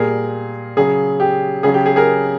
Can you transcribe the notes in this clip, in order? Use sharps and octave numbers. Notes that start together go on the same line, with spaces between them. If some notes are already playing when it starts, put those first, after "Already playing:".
Already playing: A#2 G3 G#4 A#4
C#3 F#3 G#4
G4
C#3 F#3 G#4
G4
G#4
G#4 A#4